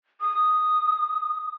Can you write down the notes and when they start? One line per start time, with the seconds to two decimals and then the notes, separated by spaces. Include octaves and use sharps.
0.21 D#6